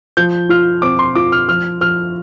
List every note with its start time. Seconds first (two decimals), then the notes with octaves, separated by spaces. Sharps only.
0.17 F3 G6
0.49 F4 F6
0.82 C4 D6
0.99 C6
1.15 F4 D6
1.32 F6
1.48 F3 F6
1.81 F3 F6